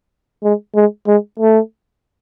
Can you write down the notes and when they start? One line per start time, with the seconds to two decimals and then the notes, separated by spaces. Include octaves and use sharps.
0.44 G#3
0.75 G#3
1.07 G#3
1.40 A3